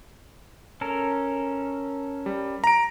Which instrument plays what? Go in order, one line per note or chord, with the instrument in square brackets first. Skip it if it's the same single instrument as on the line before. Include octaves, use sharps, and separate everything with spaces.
[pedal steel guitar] C#4 A4 A#4
[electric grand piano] G3
A#5 D7